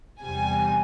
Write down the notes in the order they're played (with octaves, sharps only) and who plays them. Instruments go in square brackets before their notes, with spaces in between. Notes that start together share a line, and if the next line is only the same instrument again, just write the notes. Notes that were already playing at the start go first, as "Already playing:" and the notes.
[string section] E2 C3 G3 G#5